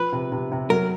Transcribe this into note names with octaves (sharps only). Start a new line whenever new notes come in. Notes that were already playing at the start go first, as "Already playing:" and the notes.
Already playing: F3 B4
C3
C3
C3
F#3 A#4